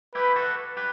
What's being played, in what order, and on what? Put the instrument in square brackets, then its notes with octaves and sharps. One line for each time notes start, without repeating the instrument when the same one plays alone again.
[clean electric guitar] E4 G4 [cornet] B4
[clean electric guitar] F#4 A4
G4 B4